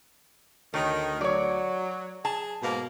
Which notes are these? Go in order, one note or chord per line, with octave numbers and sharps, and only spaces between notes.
D2 D#3 A3 C#5
F#3 C#5 D5
G#4 A5
G#2 B2 A#3